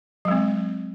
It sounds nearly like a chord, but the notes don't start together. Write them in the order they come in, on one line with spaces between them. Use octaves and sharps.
F#3 G#3 C4